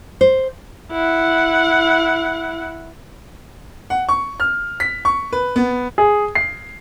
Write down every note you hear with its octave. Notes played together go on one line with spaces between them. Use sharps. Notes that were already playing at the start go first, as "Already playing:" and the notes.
C5
E4 F#5
F#5
C#6
F6
B6
C#6
B4
B3
G#4
C7